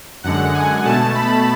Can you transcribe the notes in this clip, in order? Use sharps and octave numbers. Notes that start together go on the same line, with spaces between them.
F#2 D3 G#3 F#5
G#5
B2 A3 A5
B5